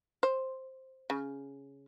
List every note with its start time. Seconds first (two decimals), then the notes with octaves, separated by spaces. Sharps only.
0.23 C5
1.10 C#3